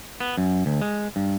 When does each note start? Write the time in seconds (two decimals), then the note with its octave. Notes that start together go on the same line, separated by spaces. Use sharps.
0.21 B3
0.38 F#2
0.66 D2
0.81 G#3
1.16 G2